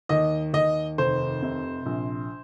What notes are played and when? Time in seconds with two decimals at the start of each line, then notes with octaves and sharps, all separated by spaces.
0.09 D#2 D#5
0.54 D#2 D#5
0.98 F1 C5
1.42 C3
1.86 A#1